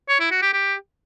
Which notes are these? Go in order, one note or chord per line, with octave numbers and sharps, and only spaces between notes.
C#5
E4
F#4
G4
G4